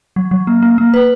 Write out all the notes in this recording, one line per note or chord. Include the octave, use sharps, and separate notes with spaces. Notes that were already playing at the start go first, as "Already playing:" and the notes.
F#3
F#3
A#3
A#3
A#3
B4